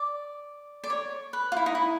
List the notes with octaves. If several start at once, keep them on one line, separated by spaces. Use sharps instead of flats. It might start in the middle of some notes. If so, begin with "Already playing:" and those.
Already playing: D5
D5
C#5
B4
F4
E4
D#4
E4